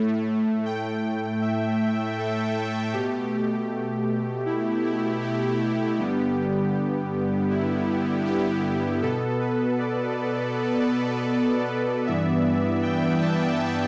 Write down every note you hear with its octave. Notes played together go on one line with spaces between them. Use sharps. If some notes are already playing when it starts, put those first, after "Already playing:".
Already playing: A2 A3
G5
E5
A4
B2 A3 G4
E4
E4
G4
G2 D3 G3 B3
G4
E4
G4
B2 B3 A4
B4
D5
G2 E3 B3 E5
G5
A5